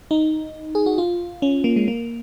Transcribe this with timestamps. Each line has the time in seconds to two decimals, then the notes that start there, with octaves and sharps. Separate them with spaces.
0.11 D#4
0.75 G#4
0.86 F#4
0.98 F4
1.42 C#4
1.64 A#3
1.76 G#3
1.88 A#3